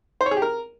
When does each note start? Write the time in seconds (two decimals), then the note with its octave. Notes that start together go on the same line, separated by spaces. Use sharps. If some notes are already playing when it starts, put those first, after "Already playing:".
0.21 C5
0.26 C#5
0.31 G#4
0.37 G4
0.42 A#4